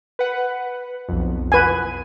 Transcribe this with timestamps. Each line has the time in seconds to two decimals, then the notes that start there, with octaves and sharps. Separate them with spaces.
0.19 B4 F#5
1.09 B1 F2
1.52 B4 G#5